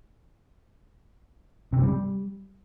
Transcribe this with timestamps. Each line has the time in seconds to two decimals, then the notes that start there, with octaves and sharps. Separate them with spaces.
1.73 C3
1.78 G2
1.83 G3